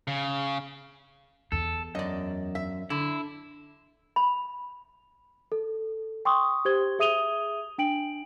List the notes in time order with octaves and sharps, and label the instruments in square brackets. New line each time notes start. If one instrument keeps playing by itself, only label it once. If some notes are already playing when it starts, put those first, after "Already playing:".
[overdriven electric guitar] C#3
[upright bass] E2 [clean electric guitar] A4
[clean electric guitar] F#2 [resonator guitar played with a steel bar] D5 D#5
[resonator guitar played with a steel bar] E5
[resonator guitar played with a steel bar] D3 [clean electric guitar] E4
[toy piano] B5
[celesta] A4
G5 C6 C#6 D#6
G4 C5 G#6 G7
G#4 E5 D#6 D#7 F7 G7
D4 G5 D7 F#7